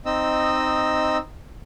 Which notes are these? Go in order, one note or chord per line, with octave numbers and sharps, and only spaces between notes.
C4 D#4 D#5 E6